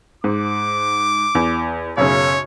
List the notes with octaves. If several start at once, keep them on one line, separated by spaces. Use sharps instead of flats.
G#2 D6
E2
B1 F#2 C#3 C#5